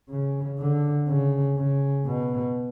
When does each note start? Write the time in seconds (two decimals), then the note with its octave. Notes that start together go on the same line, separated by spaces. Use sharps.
0.09 C#3
0.59 D3
1.08 C#3
1.57 C#3
2.05 B2